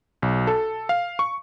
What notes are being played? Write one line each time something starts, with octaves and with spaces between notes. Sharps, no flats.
B1
A4
F5
C#6